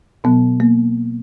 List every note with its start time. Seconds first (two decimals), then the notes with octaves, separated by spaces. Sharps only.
0.24 B2 F#3 B3
0.60 A#3